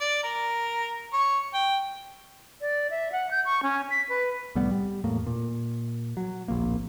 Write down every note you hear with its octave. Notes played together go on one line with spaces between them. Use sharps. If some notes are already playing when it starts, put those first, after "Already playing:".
D5
A#4
C#5
G5
D5
E5
F#5
G6
C#6
C#4
B6
B4
C2 A2 G3 B3
G3
E2 A2 A#3
A#2
F#3
D1 A#1 A#3